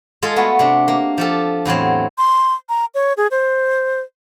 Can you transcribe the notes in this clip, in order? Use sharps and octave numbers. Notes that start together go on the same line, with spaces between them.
G#3 F4 G#4 A4
A3 B3 F#4
C3 D4
A#3
F3 G4 A4
E2 A2 F#3 C4
C6
A#5
C#5
G#4
C5